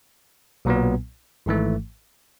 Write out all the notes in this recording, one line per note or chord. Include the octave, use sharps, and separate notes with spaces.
B1 A#2 F#3 B3
G#1 G#2 E3 A3